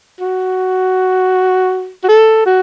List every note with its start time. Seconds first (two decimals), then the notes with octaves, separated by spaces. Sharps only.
0.21 F#4
2.04 F#4
2.09 A4
2.46 F#4